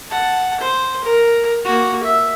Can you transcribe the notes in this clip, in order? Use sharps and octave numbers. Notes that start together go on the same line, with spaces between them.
F#5 A5
C5
A#4
A#3 F#4
E5